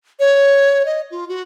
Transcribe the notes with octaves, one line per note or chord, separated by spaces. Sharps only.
C#5
D#5
F4
F#4